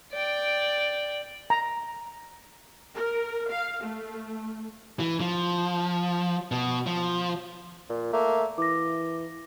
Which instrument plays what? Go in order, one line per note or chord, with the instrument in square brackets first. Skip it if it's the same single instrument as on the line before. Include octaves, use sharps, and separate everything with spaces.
[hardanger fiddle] D5 G5
[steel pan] A#5
[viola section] A#4
F5
A3
[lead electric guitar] E3
F3
B2
F3
[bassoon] A#2
[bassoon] A3 [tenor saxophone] A#3
[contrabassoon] E3 [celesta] D6 A#6